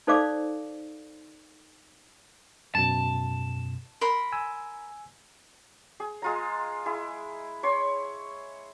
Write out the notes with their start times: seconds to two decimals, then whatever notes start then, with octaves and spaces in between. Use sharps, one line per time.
0.07 D#4 A4 C5 D5 F5 D6
2.75 F#2 B2 A5
4.01 A#4 B5 C6
4.32 G#5 E6
6.00 G#4
6.22 G#3 F4 A#5
6.86 E4 G#4
7.63 C#5 C6